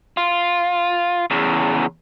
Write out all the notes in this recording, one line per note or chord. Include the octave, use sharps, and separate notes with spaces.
F4
E2 C#3